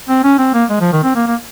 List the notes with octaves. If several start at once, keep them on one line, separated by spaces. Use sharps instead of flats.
C4
C#4
C4
A#3
G#3
F3
D#3
C4
A#3
A#3